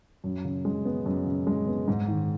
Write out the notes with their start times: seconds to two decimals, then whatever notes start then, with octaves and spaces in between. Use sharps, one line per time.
0.24 F#2
0.45 C#3
0.65 G#3
0.85 B3
1.06 F#2
1.26 C#3
1.47 G#3
1.67 B3
1.88 G#2
2.08 D#3